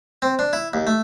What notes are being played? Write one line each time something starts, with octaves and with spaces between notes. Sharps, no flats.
C4
D4
E4
D#2
A3